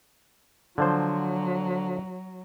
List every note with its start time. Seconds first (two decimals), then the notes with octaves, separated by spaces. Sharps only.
0.78 D3 F3 F#3 C5